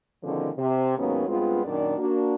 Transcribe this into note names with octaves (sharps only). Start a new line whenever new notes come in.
B2 D3 D#3 F3 G#3 C#4
C3
D#2 G#2 F#3 A#3 B3 C#4
G2 G#3 B3 C4 F4
F#2 A#2 D#3 D4 D5
A#3 D4 F#4